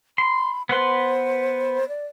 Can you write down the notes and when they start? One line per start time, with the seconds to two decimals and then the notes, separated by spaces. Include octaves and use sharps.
0.18 B5 C6
0.69 B3 B4 C5 C6
1.89 D5